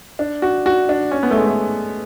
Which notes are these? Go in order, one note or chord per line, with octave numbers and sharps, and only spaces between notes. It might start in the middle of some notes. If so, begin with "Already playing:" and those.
D4
F#4
F#4
D4
C#4
B3
A3
G#3
A3